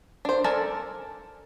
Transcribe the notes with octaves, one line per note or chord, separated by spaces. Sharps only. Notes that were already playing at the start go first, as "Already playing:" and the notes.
D4 C5
A4 A#4 D5 G#5 A5